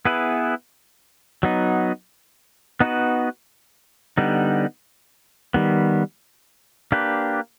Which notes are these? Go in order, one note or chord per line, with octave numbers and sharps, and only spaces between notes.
B3 E4 G#4 B4
F#3 B3 D#4
B3 D#4 F#4 B4
D3 G3 B3 D#4
D#3 G3 B3
A#3 D4 G4 B4